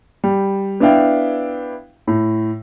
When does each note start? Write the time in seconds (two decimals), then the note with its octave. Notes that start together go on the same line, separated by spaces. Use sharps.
0.24 G3
0.80 B3 D4 E4 F5 G5
2.07 A2